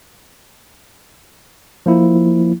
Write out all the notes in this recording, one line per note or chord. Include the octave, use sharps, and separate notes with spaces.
F3 A#3 E4